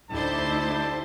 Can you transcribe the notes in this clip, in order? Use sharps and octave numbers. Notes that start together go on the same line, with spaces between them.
D2 A3 D#4 E4 G4 C5 D5 A5